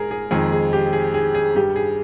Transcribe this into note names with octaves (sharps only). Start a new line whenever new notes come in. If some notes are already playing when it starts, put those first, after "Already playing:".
Already playing: G#2 G#4 A#4
G#4
F2 D#3 G#3 G#4
G#4
G4
G#4
G#4
G#4
G2 G3 G4
G#4